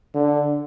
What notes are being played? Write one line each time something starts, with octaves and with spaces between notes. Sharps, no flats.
D3